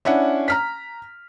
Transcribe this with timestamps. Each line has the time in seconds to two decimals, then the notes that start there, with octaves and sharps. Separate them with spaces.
0.05 C#4 D4 E4 F#5
0.48 A#5 F6 B6